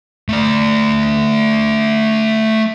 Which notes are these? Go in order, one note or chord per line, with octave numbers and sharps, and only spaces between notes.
A3 D5